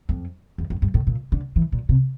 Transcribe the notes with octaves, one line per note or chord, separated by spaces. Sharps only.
F2
E2
F2
G2
A2
A#2
D3
E3
A#2
C3